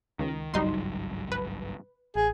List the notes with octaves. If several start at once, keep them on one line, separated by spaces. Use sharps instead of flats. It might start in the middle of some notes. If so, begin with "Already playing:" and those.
C#2 D#3
G#1 C#2 G2 F#3 G3 D#4 C6
B4
A1 G#4